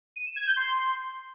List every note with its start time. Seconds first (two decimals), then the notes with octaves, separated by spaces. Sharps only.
0.16 D#7
0.26 E7
0.36 G#6
0.46 G6
0.56 C6